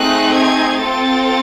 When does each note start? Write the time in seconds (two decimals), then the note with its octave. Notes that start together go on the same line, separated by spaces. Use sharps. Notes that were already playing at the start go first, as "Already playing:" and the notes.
Already playing: A3 C4 D#4 G#4 F#6
0.32 G#6
0.80 C4 F4 A4 A6